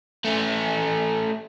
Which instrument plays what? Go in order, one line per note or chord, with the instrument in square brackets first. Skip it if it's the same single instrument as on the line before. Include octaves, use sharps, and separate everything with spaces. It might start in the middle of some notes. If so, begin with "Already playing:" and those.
[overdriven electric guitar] A3 C#4